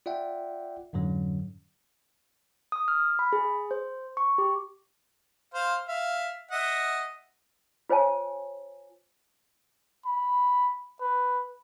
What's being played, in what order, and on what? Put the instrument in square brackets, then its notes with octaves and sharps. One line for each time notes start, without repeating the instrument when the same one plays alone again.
[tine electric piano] F4 D5 E5 F#5 G5
F2 G#2 D3 F#3 C#4
[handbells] D#6
F6
B5
G#4
C5
C#6
G4
[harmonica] C5 F5
E5 F5
D#5 E5 F#5
[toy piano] F4 C5 C#5 G#5 A5
[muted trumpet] B5
B4